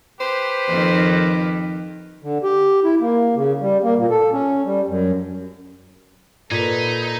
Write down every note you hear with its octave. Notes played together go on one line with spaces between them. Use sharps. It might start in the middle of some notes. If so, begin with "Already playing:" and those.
G4 B4 C5
F2 D#3
D3
G4
E4
A#3
C#3
G3
A#3
A#2
A4
C#4
G3
F#2
A#2 D#4 A4 B4 G#6 B6